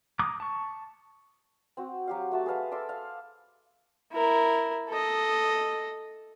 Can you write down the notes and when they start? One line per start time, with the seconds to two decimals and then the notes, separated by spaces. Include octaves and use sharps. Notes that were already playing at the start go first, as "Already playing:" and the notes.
0.19 A#5 D6 D#6
0.40 A5 C#6
1.77 C4 F#4
2.07 F#3 G4 F5
2.31 A3 F#4 A5
2.46 G#4 B4 F5 A5
2.71 A4 E5 C6 D6
2.89 F5
4.13 E4 A#4
4.90 A4 D#5